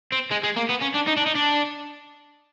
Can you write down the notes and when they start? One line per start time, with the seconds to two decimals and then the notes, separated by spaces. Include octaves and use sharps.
0.12 C4
0.31 G#3
0.43 G#3
0.56 A#3
0.69 B3
0.81 C#4
0.94 D4
1.07 D#4
1.17 D4
1.26 D#4
1.35 D4